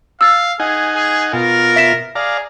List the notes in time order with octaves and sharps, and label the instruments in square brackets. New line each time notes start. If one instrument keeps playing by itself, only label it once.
[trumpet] F5 [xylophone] E6 A6
[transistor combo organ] D#4 F#5 G#5 [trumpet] G#4
[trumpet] G#4
[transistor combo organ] B2 F4 [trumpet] A#4
[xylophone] E5 B6 E7
[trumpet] G#4 [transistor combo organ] D5 F5 A#5